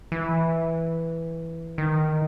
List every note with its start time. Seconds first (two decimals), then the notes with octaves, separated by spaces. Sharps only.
0.12 E3
1.78 D#3